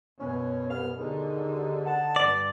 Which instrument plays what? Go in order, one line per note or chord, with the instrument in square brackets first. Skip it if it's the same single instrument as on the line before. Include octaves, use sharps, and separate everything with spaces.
[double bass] F#2 B2 [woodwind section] C#4
[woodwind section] C2 B3 F6
[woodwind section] D#2 G#2 [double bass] D3 D#4
[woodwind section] F#5 A5
[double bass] G2 [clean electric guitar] D5